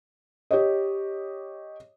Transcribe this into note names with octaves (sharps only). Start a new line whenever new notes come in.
G4 C#5 D#5